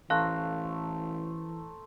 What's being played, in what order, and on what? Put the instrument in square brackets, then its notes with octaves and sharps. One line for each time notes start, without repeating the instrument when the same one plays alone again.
[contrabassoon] A1 [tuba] E3 [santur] A3 C5 A#5 [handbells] F5 F#6